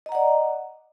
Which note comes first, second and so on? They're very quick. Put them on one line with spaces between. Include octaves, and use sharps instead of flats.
D#5 A#5 F#5 D5